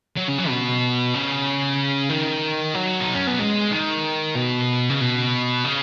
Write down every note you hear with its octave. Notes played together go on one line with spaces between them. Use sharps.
F#3
C#3
F#3
B2
C#3
D#3
F#3
D#4
C#4
B3
G#3
D#3
B2
C#3
B2
C#3